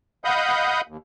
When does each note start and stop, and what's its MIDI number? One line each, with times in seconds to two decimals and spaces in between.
0.24 0.81 75
0.24 0.81 77
0.24 0.81 78
0.24 0.81 83
0.24 0.81 87
0.24 0.81 91
0.88 0.97 39